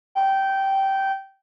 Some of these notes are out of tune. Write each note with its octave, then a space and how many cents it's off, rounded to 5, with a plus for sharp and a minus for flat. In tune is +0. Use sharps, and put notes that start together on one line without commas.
G5 -15